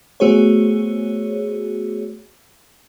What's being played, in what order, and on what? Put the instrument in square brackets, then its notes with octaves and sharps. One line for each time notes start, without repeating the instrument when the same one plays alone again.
[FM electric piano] A3 B3 F#4 G#4 C5 C#5